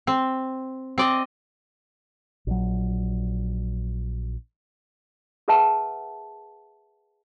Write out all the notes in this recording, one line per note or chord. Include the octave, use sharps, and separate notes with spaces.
C4
C4 D5 D#5
A#1 F#3
G#4 A#4 B4 E5 F#5 A5